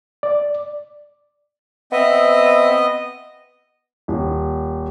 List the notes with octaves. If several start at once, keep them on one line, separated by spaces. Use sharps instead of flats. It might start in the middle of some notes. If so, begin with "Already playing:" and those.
D5
B3 C4 D#5 E5
D#1